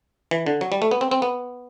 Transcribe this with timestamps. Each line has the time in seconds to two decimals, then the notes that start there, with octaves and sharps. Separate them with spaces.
0.31 E3
0.46 D3
0.61 F#3
0.72 G3
0.82 A3
0.91 B3
1.01 C4
1.11 C4
1.22 B3